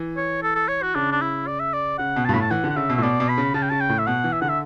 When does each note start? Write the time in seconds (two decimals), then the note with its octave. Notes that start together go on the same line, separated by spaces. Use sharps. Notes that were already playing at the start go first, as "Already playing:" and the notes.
Already playing: E3
0.17 C#5
0.43 A4
0.55 A4
0.68 C#5
0.82 F#4
0.95 C#3 D4
1.11 D4
1.21 E4
1.47 D5
1.60 E5
1.74 D5
1.98 C#3 F#5
2.16 B2
2.25 A5
2.29 G2
2.34 A2 B5
2.41 A5
2.50 E3 F#5
2.64 D3
2.70 F#5
2.76 C#3 E5
2.89 B2
2.96 A2 E5
3.03 B2 D5
3.20 B2
3.29 B5
3.38 C#3
3.54 C#3 A5
3.62 G5
3.70 C#3 A5
3.80 G5
3.89 A2
3.99 E5
4.07 B2 F#5
4.24 E3
4.32 E5
4.41 D3 F#5
4.49 E5